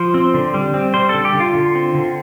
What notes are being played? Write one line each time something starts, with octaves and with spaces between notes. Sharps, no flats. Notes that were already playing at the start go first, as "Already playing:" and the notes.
Already playing: F3 C5
C4
D3
G3
C4
G3 C5
A4
D3
G4
D3
F4
D3
C4
D3